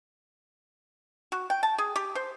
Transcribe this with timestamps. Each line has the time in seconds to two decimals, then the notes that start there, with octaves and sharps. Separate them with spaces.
1.32 F#4
1.50 G5
1.63 A5
1.78 G#4
1.96 G4
2.15 C5